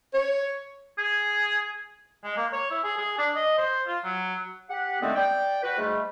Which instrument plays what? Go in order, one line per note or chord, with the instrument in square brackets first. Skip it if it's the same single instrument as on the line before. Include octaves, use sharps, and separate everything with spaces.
[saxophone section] C#5
[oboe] G#4
[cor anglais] G#3
A#3
C#5
E4
G#4
G#4
D4
D#5
C5
F4
F#3
[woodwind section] G4 F#5
D3 D#3 G#3 A3 B3 C4
D5 G5
F#4 B4
G#2 G3 A3